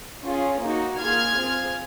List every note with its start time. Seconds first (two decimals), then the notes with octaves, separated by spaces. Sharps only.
0.24 C#4 F4 G#4
0.61 A#3 D#4 F#4
0.99 A#3 F4 G#4 F6 G#6
1.36 C4 F4 G#4